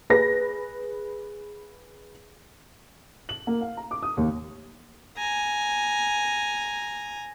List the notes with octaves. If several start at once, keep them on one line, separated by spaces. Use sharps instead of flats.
G#4 B4 A#6
F#7
A#3
F5
A#5
D6
D#6
D#2
G#5 A#5